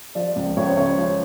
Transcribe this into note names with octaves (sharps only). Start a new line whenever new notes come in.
F3 D5
C#2
C#2 C#5
C5
C#3 C#5
F3